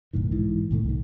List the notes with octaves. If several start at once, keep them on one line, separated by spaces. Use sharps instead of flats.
B1 F#2 A2 D#3
G#2 E3
C2 A2 D#3 A3
C2 D#3